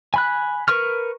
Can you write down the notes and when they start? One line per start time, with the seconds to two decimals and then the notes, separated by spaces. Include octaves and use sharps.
0.14 G#5 B5 F#6
0.68 A#4 B4 C#6 F6